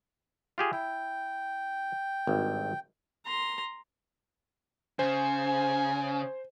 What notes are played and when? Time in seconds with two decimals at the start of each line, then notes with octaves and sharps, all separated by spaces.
0.58 F4 G4 G#4
0.73 E4 G5
2.27 G#1 G2
3.26 A#5 C6
4.99 C#3 C5 G#5